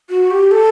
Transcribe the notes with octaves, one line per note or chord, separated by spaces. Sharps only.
F#4
G4
A4